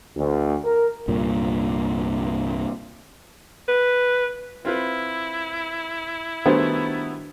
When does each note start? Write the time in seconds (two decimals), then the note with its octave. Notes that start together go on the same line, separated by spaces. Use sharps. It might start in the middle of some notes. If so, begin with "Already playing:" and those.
0.17 D2
0.64 A#4
1.08 C2 G2 A#2
3.69 B4
4.65 C4 E4 F4 B4
6.46 D#3 G3 A3 B3 D4 F#4 C5